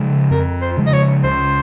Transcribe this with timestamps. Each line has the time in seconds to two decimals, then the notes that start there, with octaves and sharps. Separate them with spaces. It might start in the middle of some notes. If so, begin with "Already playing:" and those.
Already playing: C#3 F3 G#3
0.31 F2 A#4
0.62 C5
0.77 C#3 F3 G#3
0.87 D#5
0.93 C#5
1.24 C#2 C5